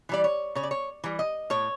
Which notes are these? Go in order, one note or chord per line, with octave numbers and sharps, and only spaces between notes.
E3 G3 D5
C#5
C#3 C#5
D5
C#5
E3 G3
D#5
A2 C#5